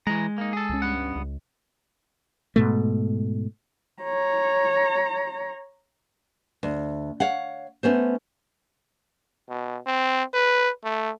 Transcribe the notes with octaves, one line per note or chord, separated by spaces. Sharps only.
E3 G#3 A#5
A#3 D#4
G#4 A4
C#2 F3 C#4
G2 B3 F#5
C#2
G#2 B2 A3
C#5 A#5
D2
C#5 F5 F#5
A3 B3 C#4 C5
B2
C4
B4
A3